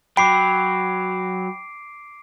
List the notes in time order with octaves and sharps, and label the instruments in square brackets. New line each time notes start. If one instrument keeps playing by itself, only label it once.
[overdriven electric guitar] F#3 [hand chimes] G5 B5 [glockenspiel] D6 C7 D7